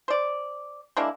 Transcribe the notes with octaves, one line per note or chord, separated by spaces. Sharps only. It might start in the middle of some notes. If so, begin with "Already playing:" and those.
C5 D5
G#3 A#3 D4 E4